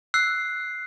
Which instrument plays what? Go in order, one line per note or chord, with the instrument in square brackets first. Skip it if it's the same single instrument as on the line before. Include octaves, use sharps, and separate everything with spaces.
[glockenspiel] E6 F#6 C7